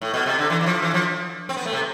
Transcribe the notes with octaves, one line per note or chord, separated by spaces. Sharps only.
A2
B2
C3
D3
E3
E3
F3
E3
F3
C4
B3
A3
C3